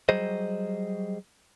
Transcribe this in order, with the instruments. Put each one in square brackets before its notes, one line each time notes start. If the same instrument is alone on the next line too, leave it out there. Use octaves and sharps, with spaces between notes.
[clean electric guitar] F#3 G3 G#4 C5 D#5